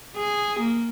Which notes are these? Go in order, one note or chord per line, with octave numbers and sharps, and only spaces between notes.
G#4
A#3